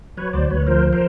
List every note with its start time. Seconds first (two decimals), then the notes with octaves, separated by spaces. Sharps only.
0.17 F#3 B4 C#5
0.33 D2 C5 D5
0.50 D2 B4 C#5
0.67 F3 A#4 C5
0.93 A#4 C5